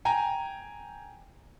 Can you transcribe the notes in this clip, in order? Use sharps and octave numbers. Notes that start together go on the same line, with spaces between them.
G5 G#5 A#5